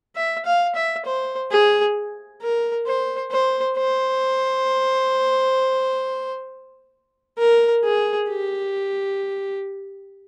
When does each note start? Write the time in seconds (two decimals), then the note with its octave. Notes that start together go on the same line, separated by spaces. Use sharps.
0.16 E5
0.45 F5
0.75 E5
1.06 C5
1.51 G#4
2.42 A#4
2.87 C5
3.31 C5
3.77 C5
7.39 A#4
7.84 G#4
8.29 G4